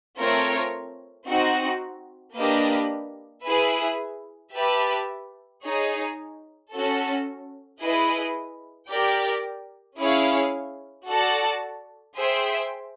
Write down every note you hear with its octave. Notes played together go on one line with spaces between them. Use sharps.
A3 C4 F4 A#4 C#5
C4 D#4 F#4
A#3 D4 G4 B4 D#5
E4 G#4 B4 E5
G4 B4 E5 A5
D#4 G#4 C#5
C#4 F#4 A4
E4 G#4 B4 D#5
G4 A#4 D5 G5
C#4 E4 G#4 C#5 F5
F#4 A4 D5 F#5 A5
G#4 C5 E5 G5